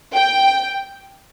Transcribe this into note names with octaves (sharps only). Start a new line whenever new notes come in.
G5